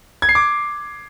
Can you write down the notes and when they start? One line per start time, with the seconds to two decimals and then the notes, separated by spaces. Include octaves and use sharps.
0.22 G#6
0.29 C7
0.35 D6